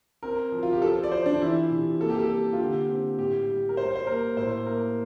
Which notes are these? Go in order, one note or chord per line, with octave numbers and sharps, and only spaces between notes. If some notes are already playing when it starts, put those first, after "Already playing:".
C4 A#4
F3
F4
G4
F3 A4
D5
F3 C5
D4
E3 E4
C3
A#3 A4
G4
A4
G3
F4
D3 G4
C4
A2 G4
G3
A#4
G3 C5
C5
A#3 A#4
A2 C5
A#3 A#4